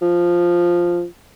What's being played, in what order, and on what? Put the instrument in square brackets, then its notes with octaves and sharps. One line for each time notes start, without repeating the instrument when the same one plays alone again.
[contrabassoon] F3